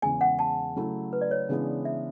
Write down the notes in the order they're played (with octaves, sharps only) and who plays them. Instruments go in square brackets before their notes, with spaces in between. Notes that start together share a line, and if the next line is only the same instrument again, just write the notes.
[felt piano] E2 C#3 G#3 [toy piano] G#5
[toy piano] F#5
A5
[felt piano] C#3 F#3 A3 E4 A4
[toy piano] B4
D5
C#5
[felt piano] C#3 E3 G#3 B3 D4
[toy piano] E5